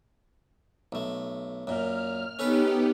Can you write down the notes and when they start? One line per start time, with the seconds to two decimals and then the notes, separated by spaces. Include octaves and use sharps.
0.92 B1 A3
1.67 F#2 A#2 F6
2.39 B3 C#4 D#4 G4 A4 B4